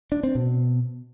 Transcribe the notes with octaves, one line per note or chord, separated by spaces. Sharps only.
D4
C4
B2